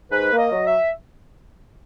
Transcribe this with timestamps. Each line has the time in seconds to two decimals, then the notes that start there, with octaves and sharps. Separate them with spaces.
0.11 G#2 B4
0.32 A#3
0.39 D#5
0.52 F#3
0.66 E5